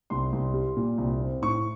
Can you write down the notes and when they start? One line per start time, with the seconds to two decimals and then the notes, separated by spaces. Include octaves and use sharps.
0.10 C2 C6
0.32 C2
0.54 G3
0.77 A#2
0.98 C2
1.20 C4
1.42 A2 C#6